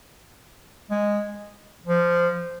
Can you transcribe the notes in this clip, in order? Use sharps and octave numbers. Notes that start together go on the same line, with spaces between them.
G#3
F3